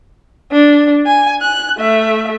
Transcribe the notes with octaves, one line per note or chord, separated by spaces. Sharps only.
D4
G#5
F#6
A3 E5